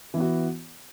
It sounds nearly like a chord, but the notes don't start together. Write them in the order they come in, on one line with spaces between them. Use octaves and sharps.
E3 B3 F#4